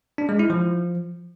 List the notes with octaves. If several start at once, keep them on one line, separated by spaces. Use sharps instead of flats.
D4
G#3
E4
F3